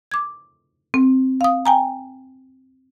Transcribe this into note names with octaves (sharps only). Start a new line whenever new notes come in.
D6 G#6
C4
F5 D#6
G5 G#5 A#5